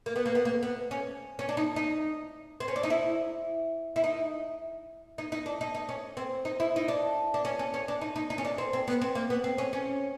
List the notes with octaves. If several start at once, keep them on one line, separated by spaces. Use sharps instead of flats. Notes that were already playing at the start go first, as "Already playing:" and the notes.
A#3
B3
A#3
B3
A#3
B3
C#4
C#4
D4
D#4
D#4
C4
C#4
D4
D#4
E4
E4
D#4
D#4
D#4
D4
D#4
D#4
C#4
C4
D#4
E4
D#4
D4
D4
C#4
C#4
C#4
D4
D#4
D#4
D#4
C#4
D4
C4
C4
B3
C4
A#3
B3
C4
C#4
C#4